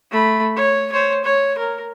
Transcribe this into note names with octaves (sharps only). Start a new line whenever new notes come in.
A3 B5
C#5
C5 C#5
C#5
A#4